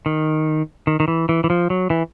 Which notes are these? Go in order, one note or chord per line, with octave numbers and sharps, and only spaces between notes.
D#3
D#3
D#3
E3
E3
E3
F3
F#3
E3